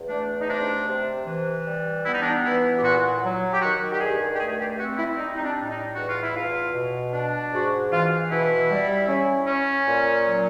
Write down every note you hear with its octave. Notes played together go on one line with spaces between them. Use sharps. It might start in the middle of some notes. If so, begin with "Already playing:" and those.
Already playing: E2
A3 D4
D#4
C3 D4
C3
E3
G3
B3 E4
D#4
D4
D#4
E3 E4
G4
A#2 F#4
F#3
G4
D#3 F#4
G4
G2 G#4
G4
A3 G#4
G4
C4 F#4
E4
G3 D#4
D#4
D4
A2
D#4
E2 F#4
F4
E4
E2 F4
B2
D4
G#2 F#4
E3 F4
B2 E4
G3
C#4
C#4
A#2
F#3